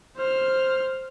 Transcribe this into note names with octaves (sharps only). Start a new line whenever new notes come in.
C5 F6